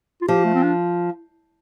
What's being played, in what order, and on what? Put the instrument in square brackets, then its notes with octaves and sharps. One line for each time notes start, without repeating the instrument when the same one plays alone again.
[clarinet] F4
[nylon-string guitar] F3 [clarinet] G4
[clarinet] A3
C4
D4